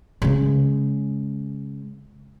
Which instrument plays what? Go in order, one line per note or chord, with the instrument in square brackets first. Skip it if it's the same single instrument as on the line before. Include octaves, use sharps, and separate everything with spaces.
[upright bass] C#3 G#3